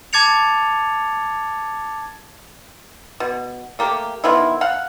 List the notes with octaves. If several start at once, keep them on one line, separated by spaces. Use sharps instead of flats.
A5 D6 G#6 A6 C#7 F7
B2
A3 A#3 G4
D#3 F3 B3 E4
F5 F#5